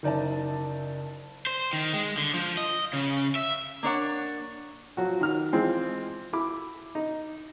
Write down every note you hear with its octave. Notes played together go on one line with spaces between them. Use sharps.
F#1 D#4 D5 E5 A5
C5
D#3
G#3
D3
F3
D#5
C#3
E5
A#3 D4 C#5 F#5
F3 F#3 F#4
D#3 F6
E3 F3 G#3 C4
E4 B5 D6
D#4